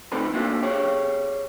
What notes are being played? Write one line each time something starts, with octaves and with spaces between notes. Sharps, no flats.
D3 A3 C4 D#4 A4 B4
A#3 D4 E4 F#4 A4 E5
G4 G#4 C#5